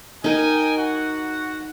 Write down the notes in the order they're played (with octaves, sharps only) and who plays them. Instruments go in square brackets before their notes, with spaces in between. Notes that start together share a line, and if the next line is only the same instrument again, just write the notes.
[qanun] D#4 A#4 [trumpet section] D#5 G5 G#5
[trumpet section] F#4 F#5